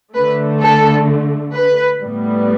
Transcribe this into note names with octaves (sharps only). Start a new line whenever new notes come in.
D3 A3 B4
A4
B4
A2 G3 B3